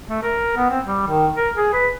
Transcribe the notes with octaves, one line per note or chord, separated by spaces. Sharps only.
A3
A#4
B3
C4
G3
D#3
A#4
G#4
B4